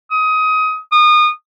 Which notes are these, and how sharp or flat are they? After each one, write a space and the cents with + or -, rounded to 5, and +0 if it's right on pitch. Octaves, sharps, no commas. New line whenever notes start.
D#6 +20
D#6 -30